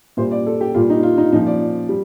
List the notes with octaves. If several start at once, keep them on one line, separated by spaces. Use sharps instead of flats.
A#2 G3 C5
D5
A4
G4
A#2 G3 F4
D#4
F4
D#4
A#2 F3 D#4
D5
G3